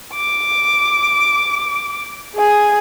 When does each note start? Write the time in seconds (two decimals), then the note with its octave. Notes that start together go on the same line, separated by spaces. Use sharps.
0.14 D6
2.35 G#4 G#5